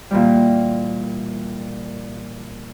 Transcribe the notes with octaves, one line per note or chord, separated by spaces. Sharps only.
A#2 E3 G3